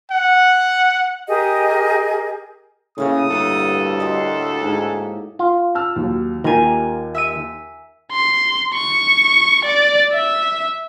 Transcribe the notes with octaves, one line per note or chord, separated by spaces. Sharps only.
F#5
G4 G#4 A#4 D#5
A2 C#3 A#3 C#5 D#6
D2 G2 A4
F#4 G4 D#5 C6
G#2 G#5
F4
A5 E6 F6
D#2 F#3
D#2 D#3 F4 G4 A#4 G#5
E5 E6 D#7
C6
C#6
D5
E5